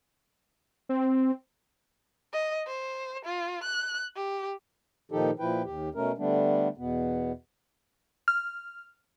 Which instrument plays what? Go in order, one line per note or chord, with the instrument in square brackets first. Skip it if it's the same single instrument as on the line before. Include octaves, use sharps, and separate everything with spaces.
[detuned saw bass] C4
[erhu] D#5
C5
F4
F#6
G4
[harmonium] A#2 D#3 F3 D#4 G4 A4
A#2 F3 E4 B4 G5
D#2 G4
B2 A3 C#4 A#4
D3 G3 A3 B3 D4
E2 B2 B3
[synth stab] F6